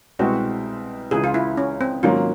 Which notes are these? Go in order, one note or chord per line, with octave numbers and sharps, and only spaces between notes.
C2 B2 G#3 C4 F#4
C#2 C#3 E3 G#4
F4
E4
C#4
C4
G#2 D#3 F#3 A#3 C#4 F4